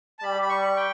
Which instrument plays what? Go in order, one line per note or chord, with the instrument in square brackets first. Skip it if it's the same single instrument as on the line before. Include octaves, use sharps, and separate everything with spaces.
[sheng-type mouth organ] A5
[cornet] G3 [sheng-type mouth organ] B5
[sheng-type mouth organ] B5
C#6
G5